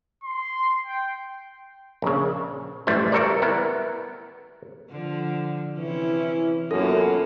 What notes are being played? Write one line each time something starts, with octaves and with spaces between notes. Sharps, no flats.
C6
G5
A#1 C#3
A1 F#2 E3 G3 A3 C5
G3 F#4 A4 A#4 C5 D5
B3 E4 A#4
D3 F3
C3 E3 C#4 E4
F#2 A#3 B3 F4 A4